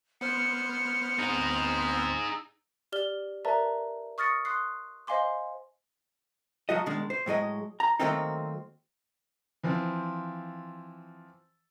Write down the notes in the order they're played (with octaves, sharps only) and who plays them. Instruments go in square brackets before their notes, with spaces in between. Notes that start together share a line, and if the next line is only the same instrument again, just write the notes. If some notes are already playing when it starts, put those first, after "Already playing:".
[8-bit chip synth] B3 C5 F6 [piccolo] C#7
[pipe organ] D2 C4 [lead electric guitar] D#4 G#4
[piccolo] E6
[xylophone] G4 D5 F6 G7
A#4 B4 D5 E5 A5 A#5
C#6 D#6 F6 A6 A#6 C#7
C6 D#6 F#6 C7
C5 D#5 F5 G#5 C6 D6
[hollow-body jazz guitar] F3 F#3 F#4 D#5
B2 D#3 G#3 D4
C5
A2 F#3 G#3 D#5
A#5
D#3 F#3 A3 A#3 C4 D#4
[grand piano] E3 F3 C4